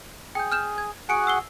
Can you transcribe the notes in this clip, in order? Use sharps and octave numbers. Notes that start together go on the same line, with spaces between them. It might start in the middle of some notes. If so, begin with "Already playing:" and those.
G#4 G5 G6
F6 G6 E7
G#6
F#4 G#4 F#5 G#5 C#7 D7
E6 C7 G7